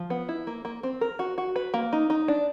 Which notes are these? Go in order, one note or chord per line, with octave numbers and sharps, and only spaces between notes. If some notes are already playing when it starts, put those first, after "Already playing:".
Already playing: F3
B3
E4
A#3
A#3
C4
A#4
F#4
F#4
B4
A#3
D#4
D#4
D4